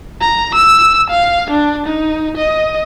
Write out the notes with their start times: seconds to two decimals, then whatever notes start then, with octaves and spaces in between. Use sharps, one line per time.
0.21 A#5
0.55 E6
1.10 F5
1.50 D4
1.86 D#4
2.37 D#5